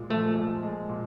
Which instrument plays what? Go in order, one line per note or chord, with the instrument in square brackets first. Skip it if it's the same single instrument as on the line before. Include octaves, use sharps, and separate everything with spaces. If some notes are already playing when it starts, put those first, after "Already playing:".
Already playing: [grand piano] A#2 G#3
[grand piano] F3 [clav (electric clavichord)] A3
[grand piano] A#2
G#3
A#2